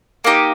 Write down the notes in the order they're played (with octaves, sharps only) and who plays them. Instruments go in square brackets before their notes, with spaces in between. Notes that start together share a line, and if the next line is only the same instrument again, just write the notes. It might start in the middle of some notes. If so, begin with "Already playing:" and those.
[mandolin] A#3 D#4 G4